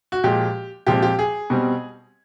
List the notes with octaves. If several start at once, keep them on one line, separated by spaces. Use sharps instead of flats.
F#4
A#2 F3 G#3 G4
A#2 F3 G#3 C4 G4
G4
G#4
B2 G3 C4